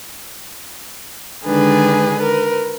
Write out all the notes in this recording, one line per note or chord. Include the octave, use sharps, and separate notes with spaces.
D3 D#3 G#3 D4 G#4 B4
A#4 B4